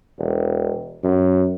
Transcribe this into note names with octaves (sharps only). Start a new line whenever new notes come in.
E1
F#2